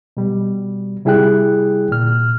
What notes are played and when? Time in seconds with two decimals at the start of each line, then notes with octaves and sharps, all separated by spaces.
0.17 B2 G3
1.05 C3 G3 E4 G#4 G5 F#6
1.91 A#2 F6